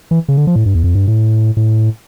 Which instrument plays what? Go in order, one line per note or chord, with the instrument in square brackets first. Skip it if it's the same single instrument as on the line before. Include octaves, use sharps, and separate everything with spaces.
[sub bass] E3
C#3
D3
F3
A2
G2
E2
F2
G2
A2
A2